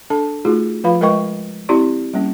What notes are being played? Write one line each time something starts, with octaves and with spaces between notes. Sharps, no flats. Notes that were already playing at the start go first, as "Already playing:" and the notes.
D4 A4 A5
A3 D#4 F4 F#4 G#4
F3 F4 B4 F5 B5
G#3 A#4 B4 D#5 G5 C#6
C4 E4 G4 D5 C6
G3 A#3 C#4